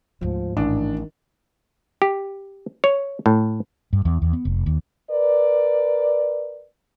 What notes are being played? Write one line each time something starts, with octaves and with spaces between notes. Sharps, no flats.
D2 G#2 F3
A1 D#3 D4
G4
C#5
A2
G2
E2
E2
B3
F1
D#2
A#4 B4 D5